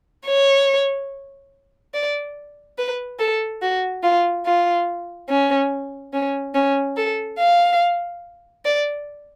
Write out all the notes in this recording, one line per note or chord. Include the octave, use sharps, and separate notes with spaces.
C#5
D5
B4
A4
F#4
F4
F4
C#4
C#4
C#4
A4
F5
D5